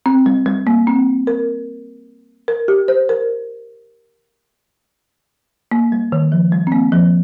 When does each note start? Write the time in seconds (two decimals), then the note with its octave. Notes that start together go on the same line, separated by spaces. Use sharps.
0.06 C4
0.26 G3
0.46 G3
0.67 A#3
0.87 C4
1.27 A#4
2.48 A#4
2.68 G4
2.88 C5
3.09 A#4
5.72 A#3
5.92 G3
6.12 D#3
6.32 F3
6.52 G3
6.67 C4
6.72 A#3
6.92 F3